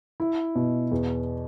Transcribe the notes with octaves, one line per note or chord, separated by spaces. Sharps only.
E4
B2
E2